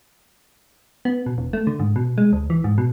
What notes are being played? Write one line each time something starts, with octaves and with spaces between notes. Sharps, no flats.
B3
B2
E1
A3
D3
G#2
B2
G#3
D2
E3
G#2
B2